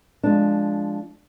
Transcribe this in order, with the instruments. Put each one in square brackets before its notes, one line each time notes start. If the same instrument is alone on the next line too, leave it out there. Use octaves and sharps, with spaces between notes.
[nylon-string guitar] F3 G#3 D4